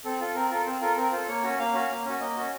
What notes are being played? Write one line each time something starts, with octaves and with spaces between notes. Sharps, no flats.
C4 A4
F4 A4
C4 A#4
F4 A4 A#4
C4 C5
F4 A4 A#4
C4 A#4
F4 A4 C5
A#3 C#5
C#4 F#4
A#3 F5
C#4 F#4
A#3
C#4 F#4
A#3 D#5
C#4 F#4